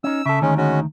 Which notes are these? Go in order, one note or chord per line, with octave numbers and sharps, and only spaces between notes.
C#4 D#4 E6
C#3 A4 E5
D2 D#3 G#3 C#4
G#3 C#4 F#4